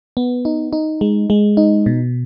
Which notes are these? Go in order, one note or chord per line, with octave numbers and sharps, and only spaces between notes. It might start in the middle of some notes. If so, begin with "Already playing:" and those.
B3
D#4
D#4
G#3
G#3
D#4
B2